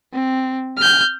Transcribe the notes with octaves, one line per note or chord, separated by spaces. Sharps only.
C4
F6 G6